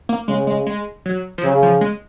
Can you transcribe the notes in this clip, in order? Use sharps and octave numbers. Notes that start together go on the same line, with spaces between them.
A#3
C#3 G#3
G#3
G#3
F#3
F3
C#3 F#3
F3
G#3